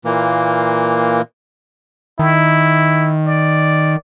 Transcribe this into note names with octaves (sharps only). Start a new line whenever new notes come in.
A#2 E3 A#3
D#3 E4
D5